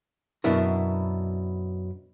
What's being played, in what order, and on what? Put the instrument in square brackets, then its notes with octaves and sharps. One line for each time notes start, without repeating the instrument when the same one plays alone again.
[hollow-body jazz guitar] F#2 B2 D4 E4 A#4